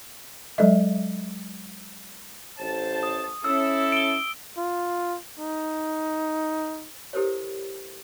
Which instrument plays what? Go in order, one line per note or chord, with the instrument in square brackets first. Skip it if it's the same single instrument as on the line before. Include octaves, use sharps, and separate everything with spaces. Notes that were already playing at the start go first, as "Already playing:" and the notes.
[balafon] F#3 G#3 A4 D#5 E5
[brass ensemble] A1 C5 A5
[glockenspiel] D#6
[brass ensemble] C#4 E4 A4 [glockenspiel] E6
[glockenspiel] D7 G7
[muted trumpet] F4
D#4
[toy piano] E4 G4 A4 A#4 C5 C#5